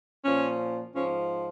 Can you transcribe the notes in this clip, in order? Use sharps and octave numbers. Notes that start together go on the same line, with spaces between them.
A#2 F3 C#4
G#2 F3 C#4